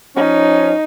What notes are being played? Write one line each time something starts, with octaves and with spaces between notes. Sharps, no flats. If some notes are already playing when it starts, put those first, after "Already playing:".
F3 C#4 D#4